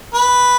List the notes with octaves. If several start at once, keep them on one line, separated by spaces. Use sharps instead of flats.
B4